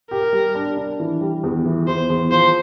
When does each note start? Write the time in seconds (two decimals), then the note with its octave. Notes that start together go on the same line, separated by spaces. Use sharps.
0.11 G4 A#4
0.33 G3
0.55 D4
0.77 D4
1.00 E3
1.21 G3
1.43 E2
1.65 E3
1.88 E2 C5
2.10 E2
2.31 F3 C5